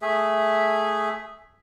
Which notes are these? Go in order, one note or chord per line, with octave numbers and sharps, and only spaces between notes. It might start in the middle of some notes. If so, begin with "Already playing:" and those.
A3 G#4 E5